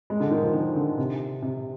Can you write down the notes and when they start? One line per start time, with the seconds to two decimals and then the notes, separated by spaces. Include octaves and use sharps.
0.10 G#3
0.20 D3
0.31 D#3
0.42 F3
0.54 D#3
0.76 D3
0.98 C3
1.42 C3